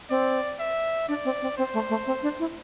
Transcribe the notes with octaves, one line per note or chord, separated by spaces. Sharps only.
C4 D5
E5
D4 D5
C4
C4
C4 C5
A3
A3
C4
D4
E4